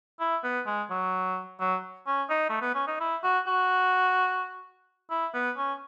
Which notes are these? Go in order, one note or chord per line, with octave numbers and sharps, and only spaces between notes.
E4
B3
G#3
F#3
F#3
C#4
D#4
A3
B3
C#4
D#4
E4
F#4
F#4
E4
B3
C#4